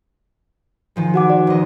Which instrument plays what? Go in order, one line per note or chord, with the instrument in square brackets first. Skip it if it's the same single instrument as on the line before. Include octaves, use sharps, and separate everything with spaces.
[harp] D#3 F3 G#3
[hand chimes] F#4 F#5 D6
D5
[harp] E1 D#5